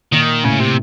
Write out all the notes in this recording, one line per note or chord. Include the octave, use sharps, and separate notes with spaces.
A#2 D#3
A2 C#3
C3